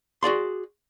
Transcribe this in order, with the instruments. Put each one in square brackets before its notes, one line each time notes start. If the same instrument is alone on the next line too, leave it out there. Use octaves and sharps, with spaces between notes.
[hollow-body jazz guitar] F#4 G#4 D5 C6